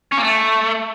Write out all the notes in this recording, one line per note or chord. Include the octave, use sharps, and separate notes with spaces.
C#4
A#3
A3